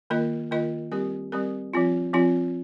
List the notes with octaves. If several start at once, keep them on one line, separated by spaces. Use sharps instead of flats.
D#3 A#3 F4 A#4 D#5
D#3 A#3 F4 A#4 D#5
G3 C4 G4 A#4
G3 C4 G4 A#4
F3 C4 F4
F3 C4 F4